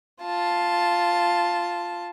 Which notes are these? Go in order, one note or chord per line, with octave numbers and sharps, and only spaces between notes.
F4 A5